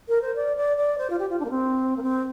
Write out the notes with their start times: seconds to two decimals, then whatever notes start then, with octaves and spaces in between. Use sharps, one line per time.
0.08 A#4
0.22 C5
0.36 D5
0.57 D5
0.77 D5
0.98 C5
1.10 F4
1.19 G4
1.30 F4
1.40 D4
1.45 A#3
1.50 C4
1.97 A#3
2.03 C4